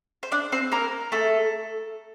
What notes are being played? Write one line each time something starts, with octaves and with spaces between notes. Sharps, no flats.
C5
D4 D5
C4 C5
A#3 A#4
A3 A4